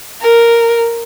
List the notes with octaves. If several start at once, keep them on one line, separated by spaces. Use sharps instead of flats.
A#4